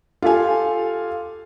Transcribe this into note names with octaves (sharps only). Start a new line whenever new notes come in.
F4 G4 A4 F5 G#5